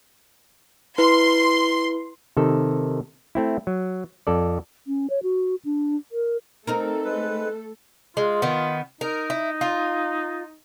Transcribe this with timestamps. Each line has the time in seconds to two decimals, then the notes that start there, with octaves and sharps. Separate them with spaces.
0.98 E4 B4 C6
2.37 C3 D#3 A4
3.35 A3 C4 E4
3.67 F#3
4.27 F2 A4 D5
4.87 C#4
5.10 C#5
5.23 F#4
5.65 D4
6.12 A#4
6.67 A3 C4 D#4 A4 A#4
7.05 G#3 B4
8.17 G#3 F4
8.42 D#3 B3
9.01 D#4 A#4
9.30 E4
9.61 F4